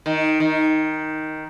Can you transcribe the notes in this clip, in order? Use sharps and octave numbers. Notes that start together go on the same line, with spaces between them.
D#3
D#3